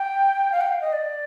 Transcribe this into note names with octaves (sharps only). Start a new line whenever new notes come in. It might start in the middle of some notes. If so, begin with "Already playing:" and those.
Already playing: G5
F5
G5
F5
D#5
D5